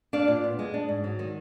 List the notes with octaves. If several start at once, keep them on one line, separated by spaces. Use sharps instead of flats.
D4 D5 F5
A#2
B3
G#3
D4
G#2
F#3
D#3